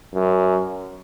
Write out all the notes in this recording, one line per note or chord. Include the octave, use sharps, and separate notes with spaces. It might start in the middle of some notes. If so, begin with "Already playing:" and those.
F#2